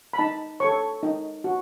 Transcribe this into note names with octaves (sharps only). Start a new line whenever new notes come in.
B5
D#4 A5
A4 C#5 C#6
D#4
F#4